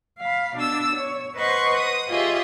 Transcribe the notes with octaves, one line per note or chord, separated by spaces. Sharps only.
F5 B5
B2 D4 E6
C#5
B4 C5 D#5 F#5 C6 C#6
D#6
F4 G4 G#4 C#5 D#5 E5